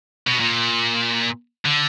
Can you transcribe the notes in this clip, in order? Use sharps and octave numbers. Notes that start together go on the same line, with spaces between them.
B2
A#2
D3